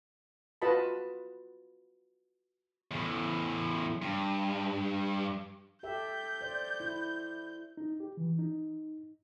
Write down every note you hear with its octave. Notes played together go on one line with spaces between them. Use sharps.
F4 F#4 B4 D#5 A5 B5
E2 A2
G2
G4 A4 E5 G6
C5 D5
E4
D#4
G4
E3
D#4